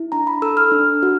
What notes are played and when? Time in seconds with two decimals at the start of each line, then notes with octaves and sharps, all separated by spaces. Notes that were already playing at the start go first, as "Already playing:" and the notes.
Already playing: E4
0.12 D4 A#5
0.27 B5
0.42 A4 E6
0.57 F6
0.72 D4
1.03 F#4